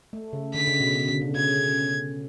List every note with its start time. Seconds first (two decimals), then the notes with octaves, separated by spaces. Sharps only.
0.13 A3
0.33 C#3
0.54 D3 B6
0.67 C#3
0.80 B2
0.95 C#3
1.09 D3
1.21 C#3
1.35 C#3 G#6